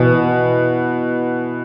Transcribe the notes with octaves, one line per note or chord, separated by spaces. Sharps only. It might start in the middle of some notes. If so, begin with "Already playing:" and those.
Already playing: B2 E3